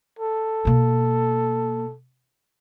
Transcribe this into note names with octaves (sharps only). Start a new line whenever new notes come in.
A4
B2 A#3